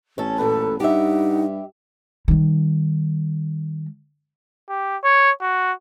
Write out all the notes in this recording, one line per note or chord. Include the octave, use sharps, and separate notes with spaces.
A1 C#4 A4
F#2 A#2 A4 B4
G2 D#4 G4 E5 F#5
D#3 G3
G4
C#5
F#4